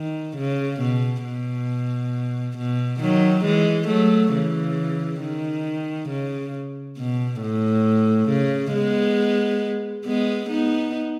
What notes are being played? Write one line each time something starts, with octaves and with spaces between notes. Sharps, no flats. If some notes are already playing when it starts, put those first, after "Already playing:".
Already playing: D#3
C#3
B2
B2
B2
D#3 F#3
E3 G#3
F#3 A3
C#3 E3
D#3
C#3
B2
A2
C#3
G#3 B3
G#3 B3
B3 D#4